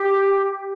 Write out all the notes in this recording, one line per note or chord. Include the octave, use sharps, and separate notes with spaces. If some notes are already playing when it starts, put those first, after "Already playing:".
Already playing: G4